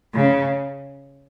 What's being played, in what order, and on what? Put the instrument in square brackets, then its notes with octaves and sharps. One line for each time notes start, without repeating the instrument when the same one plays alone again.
[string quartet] C#3